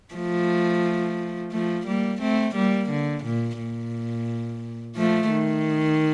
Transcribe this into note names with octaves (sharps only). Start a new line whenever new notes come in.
F3 A3
F3 A3
G3 A#3
A3 C4
G3 A#3
D3
A#2
A#2
F3 A3
D#3